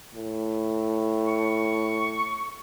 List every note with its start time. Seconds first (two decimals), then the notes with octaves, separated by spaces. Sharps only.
0.14 A2
1.27 C#6